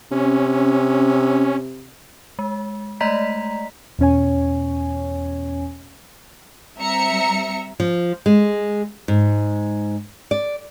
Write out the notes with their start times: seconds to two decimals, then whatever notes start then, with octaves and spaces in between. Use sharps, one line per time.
0.11 C3 C#4
2.39 G#3
3.00 G#3 A3 D5 D#5 A#5 B6
3.99 E2 B2 C#4 C#5 G#5
6.77 G3 C4 E5 A#5 C#7
7.80 F3
8.26 G#3
9.08 G#2
10.31 D5